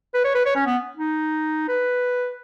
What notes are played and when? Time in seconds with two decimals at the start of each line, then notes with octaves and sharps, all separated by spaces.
0.14 B4
0.24 C#5
0.35 B4
0.45 C#5
0.55 C#4
0.66 B3
0.97 D#4
1.68 B4